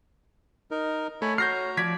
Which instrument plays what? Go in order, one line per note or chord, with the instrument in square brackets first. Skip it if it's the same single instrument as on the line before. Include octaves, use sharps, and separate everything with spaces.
[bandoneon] D#4 A#4
[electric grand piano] A3 [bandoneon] C#5 G#5 B5
[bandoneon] F#4 A#5 [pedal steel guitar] C#5 F6 [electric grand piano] G6 A#6 C7
[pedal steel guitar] F3 D5 [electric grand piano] G#6 B6